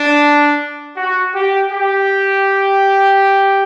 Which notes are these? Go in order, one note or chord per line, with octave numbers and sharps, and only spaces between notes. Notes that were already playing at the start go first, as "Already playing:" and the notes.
Already playing: D4
F#4
G4
G4